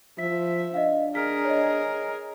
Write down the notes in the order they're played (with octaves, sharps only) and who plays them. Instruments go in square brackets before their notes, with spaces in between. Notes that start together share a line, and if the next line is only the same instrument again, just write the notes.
[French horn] F3 [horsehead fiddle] E5 [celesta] B6
[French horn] D4 [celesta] D#5 F5
[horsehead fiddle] G#4 A#4 [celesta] F6 B6
[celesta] C#5 D#5